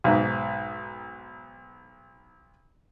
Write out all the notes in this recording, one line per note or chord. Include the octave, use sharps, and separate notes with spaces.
B1 G#2